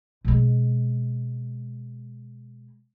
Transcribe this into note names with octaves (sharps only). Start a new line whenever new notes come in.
B2 G#3